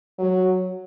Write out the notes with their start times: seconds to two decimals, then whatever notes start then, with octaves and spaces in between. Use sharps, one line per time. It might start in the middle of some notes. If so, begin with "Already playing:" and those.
0.18 F#3